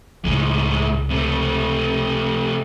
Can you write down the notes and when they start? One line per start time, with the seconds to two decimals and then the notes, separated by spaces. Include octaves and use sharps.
0.24 C#2 A2 G#3
1.10 C3 A3